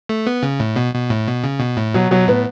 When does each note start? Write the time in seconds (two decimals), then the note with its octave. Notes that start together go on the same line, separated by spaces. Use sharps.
0.09 A3
0.27 B3
0.43 C#3
0.60 A2
0.76 B2
0.94 B2
1.10 A2
1.27 B2
1.44 C#3
1.60 B2
1.77 A2
1.94 B2 F#3
2.11 B2 F#3
2.28 A2 B3